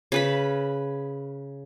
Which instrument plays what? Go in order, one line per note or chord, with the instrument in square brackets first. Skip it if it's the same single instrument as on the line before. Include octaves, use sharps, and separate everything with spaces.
[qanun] C#3 B4 B5